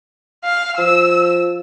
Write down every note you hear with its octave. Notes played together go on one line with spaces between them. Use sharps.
F5
F3 E6